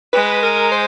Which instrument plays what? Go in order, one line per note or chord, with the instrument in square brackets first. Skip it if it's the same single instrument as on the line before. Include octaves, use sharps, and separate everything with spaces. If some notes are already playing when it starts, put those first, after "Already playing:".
[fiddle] G#3 [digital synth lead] B4
[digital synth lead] A#4
C5